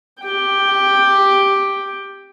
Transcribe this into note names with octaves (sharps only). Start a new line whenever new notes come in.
G4 G5